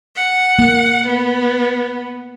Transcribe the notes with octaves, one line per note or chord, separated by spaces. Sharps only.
F#5
A#3
B3